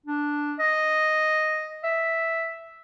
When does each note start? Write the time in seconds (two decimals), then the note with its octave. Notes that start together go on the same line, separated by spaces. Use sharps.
0.06 D4
0.59 D#5
1.84 E5